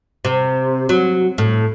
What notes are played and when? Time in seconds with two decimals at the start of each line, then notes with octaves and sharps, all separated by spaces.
0.25 C3
0.89 F#3
1.38 A2